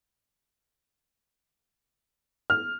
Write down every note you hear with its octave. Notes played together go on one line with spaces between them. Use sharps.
F6